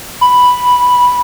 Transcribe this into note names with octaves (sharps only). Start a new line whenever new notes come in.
B5